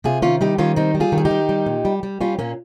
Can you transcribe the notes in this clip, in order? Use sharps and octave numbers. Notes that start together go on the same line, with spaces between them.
C3 F4 G#4
D#3 C#4 F4
G3 D#4 G4
D#3 C#4 F4
G3 C4 D#4
G3
F4 G#4
D#3
G#4
D#4 G4
D#3
G3
A#2
G3
G3
G3 C#4 F4
A#2 A#3 C#4